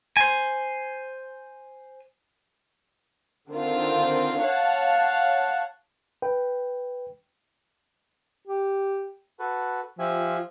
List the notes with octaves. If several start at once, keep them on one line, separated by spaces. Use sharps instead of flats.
C5 G#5
D3 D#3 C4 F4
C#5 F5 F#5 A5
B4 G5
G4
F#4 A4 B4
F3 F4 G4 E5 G#5